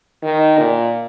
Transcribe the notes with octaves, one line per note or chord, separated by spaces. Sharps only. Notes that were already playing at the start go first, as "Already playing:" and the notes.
D#3
A#2